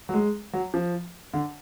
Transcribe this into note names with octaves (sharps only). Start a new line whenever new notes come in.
F#3
G#3
F#3
F3
D3